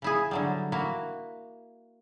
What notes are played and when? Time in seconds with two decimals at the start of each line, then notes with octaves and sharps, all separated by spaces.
0.02 C#3 E4 G#4
0.31 D3 F#3 G3
0.72 A#3 E4 F#4